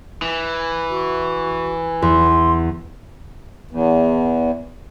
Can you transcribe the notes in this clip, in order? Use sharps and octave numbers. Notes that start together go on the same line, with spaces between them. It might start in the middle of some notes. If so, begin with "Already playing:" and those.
E3
F#4
E2 C6
E2